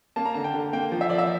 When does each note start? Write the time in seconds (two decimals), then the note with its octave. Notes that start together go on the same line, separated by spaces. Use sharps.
0.16 A#3 A5
0.25 A#5
0.34 D3 A5
0.44 G5
0.54 D3
0.73 A#3 G5
0.92 F3
1.01 E5
1.10 F3 D5
1.18 E5